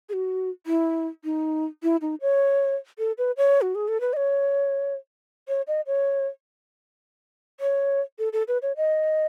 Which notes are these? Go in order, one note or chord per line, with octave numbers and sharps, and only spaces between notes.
G#4
F#4
E4
D#4
E4
D#4
C#5
A4
B4
C#5
F#4
G#4
A4
B4
D#5
C#5
C#5
D#5
C#5
C#5
A4
A4
B4
C#5
D#5